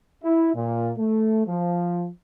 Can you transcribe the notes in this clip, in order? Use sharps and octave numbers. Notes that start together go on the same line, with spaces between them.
E4
A#2
A3
F3